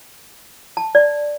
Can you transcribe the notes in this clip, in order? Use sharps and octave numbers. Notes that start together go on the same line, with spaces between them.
A5
D5